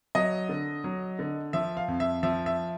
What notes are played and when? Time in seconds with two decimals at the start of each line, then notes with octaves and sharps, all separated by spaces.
0.15 F#3 D#5
0.49 D3
0.84 F#3
1.19 D3
1.53 F3 E5
1.77 F5
1.88 F2
2.00 E5
2.23 F3 E5
2.46 E5